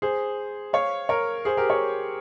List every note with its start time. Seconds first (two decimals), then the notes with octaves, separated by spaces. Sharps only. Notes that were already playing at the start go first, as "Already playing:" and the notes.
0.02 G#4 C5
0.73 C#5 F5
1.09 A#4 C#5
1.45 G#4 C5
1.57 G4 A#4
1.69 A#4 C#5